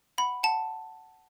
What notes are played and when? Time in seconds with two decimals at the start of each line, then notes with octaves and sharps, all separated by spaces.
0.18 F#5 B5
0.43 F#5 A5